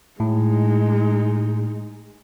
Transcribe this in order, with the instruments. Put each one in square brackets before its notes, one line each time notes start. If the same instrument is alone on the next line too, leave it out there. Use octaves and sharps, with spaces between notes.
[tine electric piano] A2 [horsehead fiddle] G#3 D#4